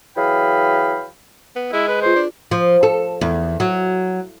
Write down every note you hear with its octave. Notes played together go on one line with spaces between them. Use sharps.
E3 F#3 G#4 F5 G5 B5
B3
G#3 E4
B4
F4 G#4 B4 C5
D4
F3
A4
E2
F#3